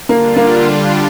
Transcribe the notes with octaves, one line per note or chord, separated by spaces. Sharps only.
D3 G3 A#3 D4 F4
A#3